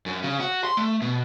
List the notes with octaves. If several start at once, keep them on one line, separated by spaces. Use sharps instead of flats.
F#2
C#3
F#4
C6
A3
B2